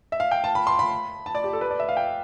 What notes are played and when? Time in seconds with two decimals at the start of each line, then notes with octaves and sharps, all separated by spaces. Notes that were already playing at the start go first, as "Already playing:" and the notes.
0.12 E5
0.20 F5
0.31 G5
0.44 A5
0.55 B5
0.67 C6
0.79 B5
1.26 A5
1.35 D5
1.44 G4
1.53 A4
1.61 B4
1.70 D5
1.80 E5
1.89 F5
1.97 G5